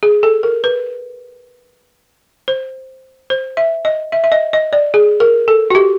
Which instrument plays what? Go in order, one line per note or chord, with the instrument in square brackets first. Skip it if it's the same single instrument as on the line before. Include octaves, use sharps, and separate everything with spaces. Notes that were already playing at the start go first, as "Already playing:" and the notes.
[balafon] G#4
A4
A#4
B4
C5
C5
E5
D#5
E5
E5
D#5
D#5
D5
G#4
A#4
A4
F#4
G4